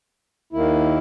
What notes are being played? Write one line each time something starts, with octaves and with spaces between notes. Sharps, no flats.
D#2 D#3 A#3 E4